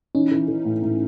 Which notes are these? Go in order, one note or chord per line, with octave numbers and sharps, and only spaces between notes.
E3 C#4 D#4
E3
E3
A2
A2